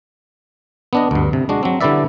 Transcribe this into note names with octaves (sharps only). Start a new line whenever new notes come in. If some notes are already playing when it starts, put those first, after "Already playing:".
B3 D4 D#5
D2 G2
C3
G#3 D4 F#4
F#3 C4
D3 G3 E4 B4 D5 E5